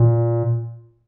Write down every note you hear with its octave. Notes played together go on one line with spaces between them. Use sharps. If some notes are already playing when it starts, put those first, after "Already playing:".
Already playing: A#2